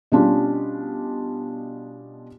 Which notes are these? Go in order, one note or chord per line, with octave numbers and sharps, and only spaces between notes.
B2 G3 C#4 D4 F4 G4